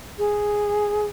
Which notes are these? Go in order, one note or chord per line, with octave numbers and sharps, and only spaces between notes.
G#4